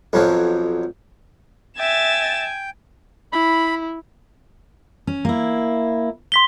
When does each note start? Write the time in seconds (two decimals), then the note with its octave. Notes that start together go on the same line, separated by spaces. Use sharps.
0.13 B1 F2 F3 F#3
1.79 E5 G5 G#5 A6 E7
3.32 E4 B5
5.07 C#4
5.25 A#3 E4
6.32 C6 B6 G7